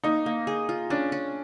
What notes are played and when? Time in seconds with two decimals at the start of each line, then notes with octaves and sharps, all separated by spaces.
0.04 A#3 D#4
0.26 A#3
0.47 G#4
0.69 F4
0.90 C#4 D4
1.12 C#4